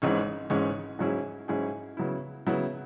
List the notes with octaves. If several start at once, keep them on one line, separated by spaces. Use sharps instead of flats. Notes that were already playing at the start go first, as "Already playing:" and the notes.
G#1 G#2 E3 G#3 C#4
G#1 G#2 E3 G#3 C#4
G#2 F#3 C#4 E4 G#4
G#2 F#3 C#4 E4 G#4
C#3 F#3 B3 E4
C#3 F#3 B3 E4